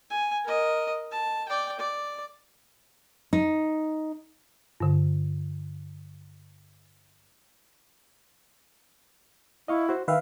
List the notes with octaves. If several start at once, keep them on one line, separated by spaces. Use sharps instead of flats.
G#5
A#4 D#5
A5
D5 G5
D5
D#4
G2 D3
E4 D#5 F5 C#6
F#4 C5
D#3 B4 E5 F5 G5